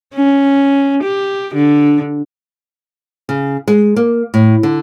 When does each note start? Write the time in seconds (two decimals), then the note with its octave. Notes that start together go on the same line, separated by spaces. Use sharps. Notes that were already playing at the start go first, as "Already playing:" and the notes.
0.14 C#4
1.03 G4
1.54 D3
3.29 C#3
3.68 G#3
3.96 A#3
4.34 A2
4.63 D3